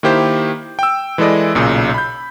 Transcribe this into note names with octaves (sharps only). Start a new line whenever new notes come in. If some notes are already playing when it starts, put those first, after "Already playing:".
D#3 A#3 E4 G4 C5 G6
G5 E6
E3 G#3 E4 A4 D5 D#5
B1 A#2 C#3
B5 G6